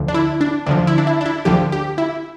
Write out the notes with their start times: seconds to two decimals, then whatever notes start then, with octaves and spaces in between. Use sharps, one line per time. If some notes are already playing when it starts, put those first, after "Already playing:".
Already playing: D2 D3 F3
0.08 D4
0.14 E4
0.41 D4
0.66 D2 D3 F3 D4
0.87 E4
0.98 D4
1.07 E4
1.21 D4
1.26 E4
1.45 D2 D3 F3 G4
1.72 G4
1.98 E4